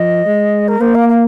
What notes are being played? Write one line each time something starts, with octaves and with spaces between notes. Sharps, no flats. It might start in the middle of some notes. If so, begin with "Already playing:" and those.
Already playing: F3 D#5
G#3
A#4
A#3 C5
F5
F5